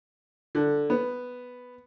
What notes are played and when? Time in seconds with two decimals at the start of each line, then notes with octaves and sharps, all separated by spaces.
0.55 D3
0.90 B3